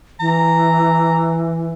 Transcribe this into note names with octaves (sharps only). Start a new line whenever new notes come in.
E3 A#5